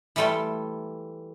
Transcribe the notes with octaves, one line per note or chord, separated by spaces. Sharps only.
E3 G3 A3 F4 G5